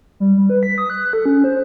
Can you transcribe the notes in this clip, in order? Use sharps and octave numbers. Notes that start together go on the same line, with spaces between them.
G3
G3
B4
B6
D#6
F#6
A4
C#4
C5